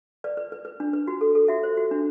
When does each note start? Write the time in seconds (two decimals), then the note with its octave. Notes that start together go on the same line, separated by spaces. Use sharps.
0.24 B4 D5
0.37 B4
0.52 B4
0.65 B4
0.80 D4
0.93 B4
1.07 F#4
1.21 A4
1.35 A4
1.48 F#4 E5
1.63 C5
1.77 F#4
1.91 D4